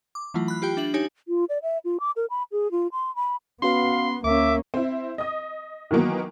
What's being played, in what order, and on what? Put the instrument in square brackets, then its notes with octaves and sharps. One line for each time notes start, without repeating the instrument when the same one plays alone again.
[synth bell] D6
E3 F#3 A3 E4 F4
B5 F#6
F4 G4 G5
D4 E5 F#7
D#4 G4 C#5 G#5
[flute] F4
D5
E5
F4
D6
A#4
B5
G#4
F4
C6
B5
[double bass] B3 [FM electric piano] C#4 F#4 B4 [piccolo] F5 [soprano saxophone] C6
[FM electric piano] D2 [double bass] A#3 C#4 [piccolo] E5 [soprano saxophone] D6
[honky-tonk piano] C4 E4
D#5 D#6
D#3 E3 F#3 A#3 B3